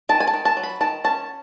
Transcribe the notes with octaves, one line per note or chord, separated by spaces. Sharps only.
D#3 A5
G#5
A5
D#3
A5
F#3
B5
D#3 A5
C#4 A5